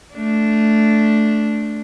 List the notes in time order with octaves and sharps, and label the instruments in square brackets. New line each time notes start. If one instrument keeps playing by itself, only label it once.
[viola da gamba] A3 D4